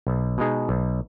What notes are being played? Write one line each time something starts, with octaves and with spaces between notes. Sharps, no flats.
B1
B2 G#3 D#4 G#4
B1